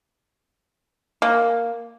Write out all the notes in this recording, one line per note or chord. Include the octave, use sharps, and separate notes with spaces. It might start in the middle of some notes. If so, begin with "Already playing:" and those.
A#3